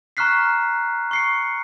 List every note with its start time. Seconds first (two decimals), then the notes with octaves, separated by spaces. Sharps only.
0.17 A#5 C#6 F6 F#6 B6 C7
1.11 C#6 C7 C#7